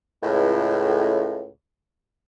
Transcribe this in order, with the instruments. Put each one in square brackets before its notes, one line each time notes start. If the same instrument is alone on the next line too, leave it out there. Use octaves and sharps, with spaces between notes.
[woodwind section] C#2 A2